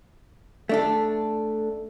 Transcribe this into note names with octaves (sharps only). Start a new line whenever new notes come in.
A3 D4 A4